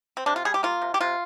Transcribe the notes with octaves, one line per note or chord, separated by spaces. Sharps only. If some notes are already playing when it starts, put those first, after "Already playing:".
C4
C3 D4
F4
G3 G#4
G4
A#3 F4
C3
G4
C3 F4